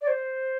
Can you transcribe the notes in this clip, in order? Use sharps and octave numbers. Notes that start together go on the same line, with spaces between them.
D5
C5